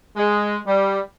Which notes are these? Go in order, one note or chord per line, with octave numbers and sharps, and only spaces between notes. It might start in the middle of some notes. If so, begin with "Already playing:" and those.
G#3
G3